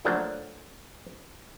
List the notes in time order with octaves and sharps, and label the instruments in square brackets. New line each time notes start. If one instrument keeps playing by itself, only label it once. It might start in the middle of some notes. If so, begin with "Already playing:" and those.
[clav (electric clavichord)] D3 F3 F#3 A3 A#3 D4